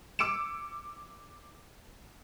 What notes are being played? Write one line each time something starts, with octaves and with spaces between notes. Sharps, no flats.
D6 E6 C#7 D7 E7